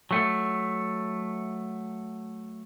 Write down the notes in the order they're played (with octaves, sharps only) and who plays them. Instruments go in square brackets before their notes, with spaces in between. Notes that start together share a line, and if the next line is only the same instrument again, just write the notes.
[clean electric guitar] F#3 A3